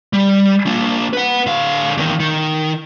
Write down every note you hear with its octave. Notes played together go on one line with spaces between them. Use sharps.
G3
A#3 D4
B4 F#5
D3 F5
E2 D#3
D#3